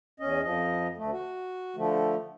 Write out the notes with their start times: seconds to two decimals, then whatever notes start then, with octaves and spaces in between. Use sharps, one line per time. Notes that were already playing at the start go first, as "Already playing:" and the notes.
0.20 E2 C#4 D#5
0.44 F2 F3 D#5
0.98 D2 A3
1.12 F#4
1.76 D3 F3 A3